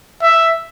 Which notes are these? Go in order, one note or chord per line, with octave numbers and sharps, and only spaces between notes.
E5